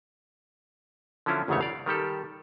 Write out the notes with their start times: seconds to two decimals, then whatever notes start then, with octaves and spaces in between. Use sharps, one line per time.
1.26 D3 F3 F#3 C#4 E4 F4
1.48 G1 E2 G#2 C#3 A3 C#5
1.61 D5 F5
1.86 D#3 G3 G4 A4